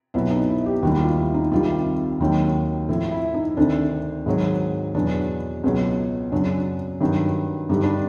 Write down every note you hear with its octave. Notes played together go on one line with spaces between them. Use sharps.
C2 B2 F#3 E4
D#4
E4
G4
D#2 D#3 G3 F#4
F4
E4
D#4
C2 C3 D#3 G3 F4
D#2 D#3 F#3
A2 F3
E4
D#4
D2 C3 D#3 D4
G#2 D#3 F#3
E2 B2 F#3 D4
C#2 B2 F#3
F#2 C#3 F#3 D4
G2 D#3 F#3
G2 D3 G3 D#4
D4